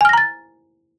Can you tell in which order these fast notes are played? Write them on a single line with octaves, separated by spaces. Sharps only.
G#5 F6 A#6 A#5 A6